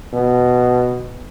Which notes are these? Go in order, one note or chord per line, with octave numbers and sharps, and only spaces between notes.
B2